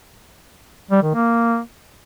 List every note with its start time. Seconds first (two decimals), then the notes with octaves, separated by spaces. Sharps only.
0.91 G3
1.03 D#3
1.14 A#3